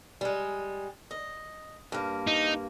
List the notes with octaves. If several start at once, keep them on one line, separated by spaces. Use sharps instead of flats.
G3 G#3
D#5
G2 A#3
D#4